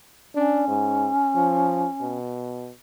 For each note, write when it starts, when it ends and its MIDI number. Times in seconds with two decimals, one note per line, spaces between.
0.36 2.17 61
0.36 0.66 62
0.68 1.10 44
1.36 1.87 53
2.01 2.71 47